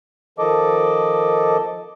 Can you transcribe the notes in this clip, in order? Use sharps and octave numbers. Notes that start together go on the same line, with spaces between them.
D#3 F3 A4 D#5 D6